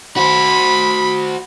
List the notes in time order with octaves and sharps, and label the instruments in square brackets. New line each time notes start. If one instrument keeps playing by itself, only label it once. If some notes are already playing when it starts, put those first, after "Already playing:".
[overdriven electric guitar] F#4 C5 [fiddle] B5